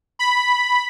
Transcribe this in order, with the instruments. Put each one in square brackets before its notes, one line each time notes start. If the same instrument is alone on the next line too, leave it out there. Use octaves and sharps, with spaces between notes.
[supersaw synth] B5